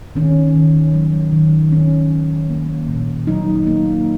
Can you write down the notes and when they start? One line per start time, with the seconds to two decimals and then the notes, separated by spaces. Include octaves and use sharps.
0.15 D#3 C#4
0.56 D#3
0.94 F#3
1.32 D#3
1.72 D#3 C#4
2.11 F#3
2.50 A#3
2.89 A#2
3.27 F#3 D#4
3.67 A#3